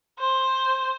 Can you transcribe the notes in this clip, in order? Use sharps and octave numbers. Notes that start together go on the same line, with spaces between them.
C5